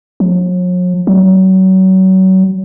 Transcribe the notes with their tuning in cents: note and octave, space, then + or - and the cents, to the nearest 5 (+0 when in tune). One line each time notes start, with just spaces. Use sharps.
F#3 -45
F#3 +30